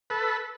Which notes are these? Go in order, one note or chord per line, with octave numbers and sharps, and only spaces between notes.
A4 B4